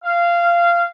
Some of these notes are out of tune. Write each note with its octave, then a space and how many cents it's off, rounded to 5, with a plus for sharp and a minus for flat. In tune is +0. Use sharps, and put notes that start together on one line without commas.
F5 -15